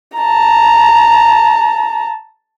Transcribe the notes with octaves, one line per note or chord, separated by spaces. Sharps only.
A5 A#5